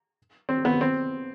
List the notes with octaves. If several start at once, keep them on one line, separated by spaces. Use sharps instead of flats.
C4
B3
C4